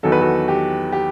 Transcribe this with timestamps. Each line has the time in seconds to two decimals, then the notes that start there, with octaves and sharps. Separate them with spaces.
0.03 E2 D#3 F#3 A4
0.12 B4
0.21 F#4 A4
0.48 G4
0.92 G4